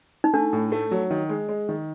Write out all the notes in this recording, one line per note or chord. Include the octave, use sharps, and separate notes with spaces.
D#4
A3 D4
A2
A3
F#3
D#3
G#3
G#3
D#3